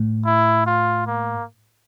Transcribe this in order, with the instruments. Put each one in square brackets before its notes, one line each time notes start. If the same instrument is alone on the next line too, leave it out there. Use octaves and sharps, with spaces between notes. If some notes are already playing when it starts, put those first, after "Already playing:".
Already playing: [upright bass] A2
[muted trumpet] E4
F4
A#3